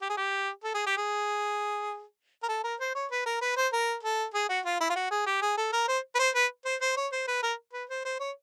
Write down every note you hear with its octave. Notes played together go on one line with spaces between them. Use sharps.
G4
G#4
G4
A4
G#4
G4
G#4
A#4
A4
A#4
C5
C#5
B4
A#4
B4
C5
A#4
A4
G#4
F#4
F4
E4
F4
F#4
G#4
G4
G#4
A4
A#4
C5
B4
C5
B4
C5
C5
C#5
C5
B4
A#4
B4
C5
C5
C#5